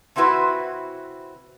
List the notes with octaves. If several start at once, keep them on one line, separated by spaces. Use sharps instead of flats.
C3 C4 E4 F#4 B4